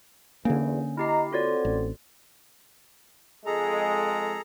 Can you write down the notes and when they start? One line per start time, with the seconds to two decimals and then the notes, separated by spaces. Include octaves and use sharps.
0.45 E2 D3 A#3 C#4
0.97 E4 G4 D#5 A#5 C7
1.33 C4 F4 F#4 A4 C#5 D5
1.65 A1
3.46 F2 G#3 G#4 A4 A#5